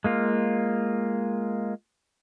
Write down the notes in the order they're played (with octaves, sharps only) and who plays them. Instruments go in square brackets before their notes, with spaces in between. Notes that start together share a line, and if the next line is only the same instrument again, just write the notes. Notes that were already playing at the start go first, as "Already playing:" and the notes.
[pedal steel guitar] G#3 A#3 F4